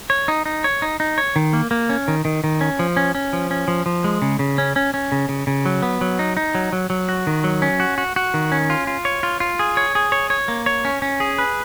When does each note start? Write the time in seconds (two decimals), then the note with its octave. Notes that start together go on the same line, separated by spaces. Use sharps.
0.10 C#5
0.28 D#4
0.46 D#4
0.64 C#5
0.82 D#4
1.00 D#4
1.18 C#5
1.36 D#3
1.53 A#3
1.71 A#3
1.89 C#4
2.08 D#3
2.25 D#3
2.44 D#3
2.61 C#4
2.79 F3
2.97 C#4
3.15 C#4
3.33 F3
3.51 C#4
3.68 F3
3.86 F3
4.04 G#3
4.22 C#3
4.39 C#3
4.58 C#4
4.76 C#4
4.94 C#4
5.12 C#3
5.29 C#3
5.47 C#3
5.66 F#3
5.82 B3
6.01 F#3
6.19 D#4
6.37 D#4
6.55 F#3
6.73 F#3
6.90 F#3
7.09 F#4
7.27 D#3
7.44 F#3
7.62 C#4
7.80 F#4
7.98 F#4
8.16 F#4
8.34 D#3
8.52 C#4
8.70 F4
8.87 F4
9.05 C#5
9.23 F4
9.40 F4
9.59 G#4
9.77 C#5
9.95 G#4
10.12 C#5
10.30 C#5
10.48 A#3
10.66 C#5
10.85 C#4
11.02 C#4
11.20 G#4
11.38 B4